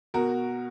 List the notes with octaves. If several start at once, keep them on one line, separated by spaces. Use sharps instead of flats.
B2 F#4 A#4